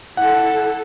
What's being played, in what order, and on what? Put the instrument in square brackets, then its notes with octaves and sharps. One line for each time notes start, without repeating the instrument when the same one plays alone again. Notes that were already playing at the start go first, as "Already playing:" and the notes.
[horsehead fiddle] E4 A4 [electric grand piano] F#5